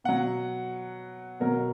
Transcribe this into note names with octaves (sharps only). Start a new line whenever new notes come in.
B2 F#3 F#5
B2 F#3 A#4